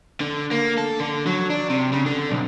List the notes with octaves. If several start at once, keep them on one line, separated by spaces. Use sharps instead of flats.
D3
A#3
A4
D3
F#3
D4
C3
C#3
D3
B1